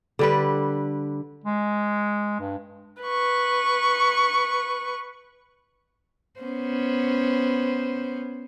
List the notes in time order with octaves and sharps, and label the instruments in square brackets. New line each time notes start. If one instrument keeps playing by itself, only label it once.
[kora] D3 G3 B4
[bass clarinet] G#3
G2
[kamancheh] B4 C#6
[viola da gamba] B3 C#4 C5